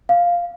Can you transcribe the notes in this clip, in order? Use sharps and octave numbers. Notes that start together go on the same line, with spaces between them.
F5